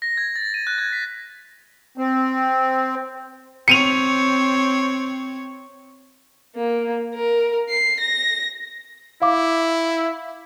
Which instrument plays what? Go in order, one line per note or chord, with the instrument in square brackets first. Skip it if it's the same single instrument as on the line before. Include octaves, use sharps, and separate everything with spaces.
[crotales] A#6
G#6
A6
D#7
F#6
G#6
B6
[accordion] C4
[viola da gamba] C4 C#5 [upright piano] C#7 D#7 F7
[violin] A#3
A#4
C7
A#6
[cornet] E4 [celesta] F5 D6